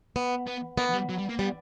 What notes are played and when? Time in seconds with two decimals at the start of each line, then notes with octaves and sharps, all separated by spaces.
0.16 B3
0.46 B3
0.78 A#3 B3
0.93 G3
1.09 F#3
1.18 G3
1.29 A#3
1.39 G3 B3